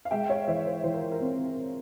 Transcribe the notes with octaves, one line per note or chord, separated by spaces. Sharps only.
F5
G#3 E5 G5
C#5 F5
E3 C5 E5
C5
E3 C5
A#4
A#4
C4